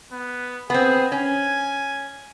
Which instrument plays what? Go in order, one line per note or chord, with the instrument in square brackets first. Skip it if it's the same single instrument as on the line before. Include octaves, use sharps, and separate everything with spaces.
[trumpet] B3
[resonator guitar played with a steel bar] B3 C4 [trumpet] G#4
[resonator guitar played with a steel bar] C#4 [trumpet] G#5